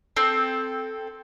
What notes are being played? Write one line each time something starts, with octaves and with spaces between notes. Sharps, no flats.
C4 A4